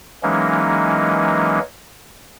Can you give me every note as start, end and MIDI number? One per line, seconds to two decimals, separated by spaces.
0.23 1.59 52
0.23 1.59 54
0.23 1.59 56
0.23 1.59 58
0.23 1.59 61
0.23 1.59 63